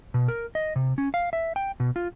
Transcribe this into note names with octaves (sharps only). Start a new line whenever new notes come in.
B2
A#4
D#5
C3
C#4
F5
E5
G5
B2
F4